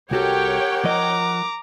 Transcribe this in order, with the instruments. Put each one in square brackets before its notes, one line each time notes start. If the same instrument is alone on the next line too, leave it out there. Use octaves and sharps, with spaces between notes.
[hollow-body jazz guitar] C2 F#4 A4 [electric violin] G4 [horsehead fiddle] A#4 F#5 [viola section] C#5 G5
[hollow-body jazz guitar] F3 D#5 [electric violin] A#5 D6